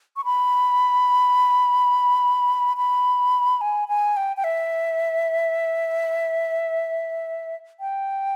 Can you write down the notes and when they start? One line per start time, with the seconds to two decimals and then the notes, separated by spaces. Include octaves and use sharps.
0.16 C#6
0.25 B5
2.77 B5
3.61 G#5
3.88 G#5
4.17 G5
4.37 G5
4.44 E5
7.80 G5